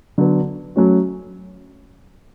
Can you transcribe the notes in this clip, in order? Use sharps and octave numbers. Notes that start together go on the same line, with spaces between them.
D3 F#3 B3
F#3 A3 C#4 F#4